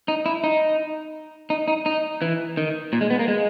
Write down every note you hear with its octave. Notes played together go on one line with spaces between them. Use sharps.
D#4
E4
D#4
D#4
D#4
D#4
E3
D#3
A#2
G#3
B3
A#3
G#3